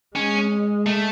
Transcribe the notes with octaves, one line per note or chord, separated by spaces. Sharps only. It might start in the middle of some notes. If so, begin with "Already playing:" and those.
G#3 C#4
A3